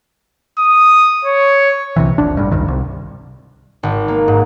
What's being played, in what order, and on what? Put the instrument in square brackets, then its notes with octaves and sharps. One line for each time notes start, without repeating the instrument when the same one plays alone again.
[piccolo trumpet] D#6
C#5
[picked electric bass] C2 C3 E3
F1 C2 D4
A1 G2
F1 C2 G2 D#3
C2
[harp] G#1
A#3
G#2